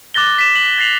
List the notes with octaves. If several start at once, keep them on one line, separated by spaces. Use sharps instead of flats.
D6 F#6 A6 A#6 G7
B6 E7
F#7
A6 A#6 C7 F7 F#7